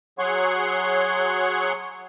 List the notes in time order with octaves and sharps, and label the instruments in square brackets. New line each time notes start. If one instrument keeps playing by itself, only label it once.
[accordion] F#3 G#4 C#5 F#5 C6 C#6